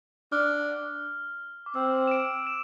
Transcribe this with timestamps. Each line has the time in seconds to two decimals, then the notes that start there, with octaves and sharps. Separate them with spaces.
0.32 D4 F6
1.66 D6
1.75 C4 E6
2.07 E7
2.11 D7
2.47 E7